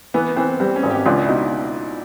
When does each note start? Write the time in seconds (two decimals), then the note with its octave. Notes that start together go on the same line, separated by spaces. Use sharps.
0.14 E3 B3
0.36 E3 C4
0.60 G3 C4
0.76 C#4
0.83 G#1
0.90 G4
1.05 C#2 D4
1.25 E4
1.28 B2 D#4